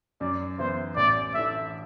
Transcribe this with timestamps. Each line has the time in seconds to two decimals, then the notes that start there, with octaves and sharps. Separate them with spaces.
0.21 F#2 D5
0.59 E3 B3 E4 C5
0.97 A1 D5
1.35 A2 E3 A3 D4 E5